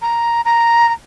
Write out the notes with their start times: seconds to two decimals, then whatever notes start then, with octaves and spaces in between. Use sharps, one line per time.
0.02 A#5
0.45 A#5
0.88 A#5